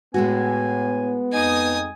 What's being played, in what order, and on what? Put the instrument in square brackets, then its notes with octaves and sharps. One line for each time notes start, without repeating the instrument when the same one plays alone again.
[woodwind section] A2 G#5 [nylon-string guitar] G#3 A3 F#4 [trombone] B3
[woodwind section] F2 D#4 D#5 [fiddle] G#5 D#6